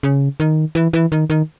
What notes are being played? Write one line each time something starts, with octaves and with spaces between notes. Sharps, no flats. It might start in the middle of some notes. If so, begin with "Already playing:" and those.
C#3
D#3
E3
E3
D#3
D#3